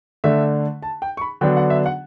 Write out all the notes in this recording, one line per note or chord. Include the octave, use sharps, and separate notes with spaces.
D3 A3 D4 E5
A5
G5
C#6
B5
D3 F#3 B3 D4 G5
F#5
E5
F#5